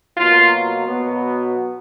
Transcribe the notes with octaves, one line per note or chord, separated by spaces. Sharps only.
B2 F#3 A#3 F4
B2 F#3 B3